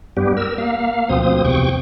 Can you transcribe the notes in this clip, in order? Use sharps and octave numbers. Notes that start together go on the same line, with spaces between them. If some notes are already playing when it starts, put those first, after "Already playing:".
G2 G3 B3 G4
A#4 E6
A#3 F5
D2 B2 F3 C4 D#6
E2 C3 G5 C#6